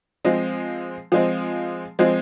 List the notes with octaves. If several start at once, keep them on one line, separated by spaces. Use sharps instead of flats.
F3 G#3 C4
F3 G#3 C4
F3 G#3 C4